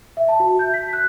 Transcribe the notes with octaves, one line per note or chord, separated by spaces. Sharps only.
E5
A5
F#4
G6
B6
F#6